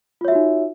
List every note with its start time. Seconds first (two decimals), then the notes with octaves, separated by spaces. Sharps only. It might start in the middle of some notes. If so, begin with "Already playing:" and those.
0.21 F4
0.25 C#5
0.28 E5
0.32 F#4
0.35 D#4